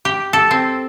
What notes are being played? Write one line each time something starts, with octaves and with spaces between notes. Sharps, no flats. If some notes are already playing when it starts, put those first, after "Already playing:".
G4
A4
C4